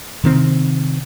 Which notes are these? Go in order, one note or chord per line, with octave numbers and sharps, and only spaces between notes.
C3 D#3 C4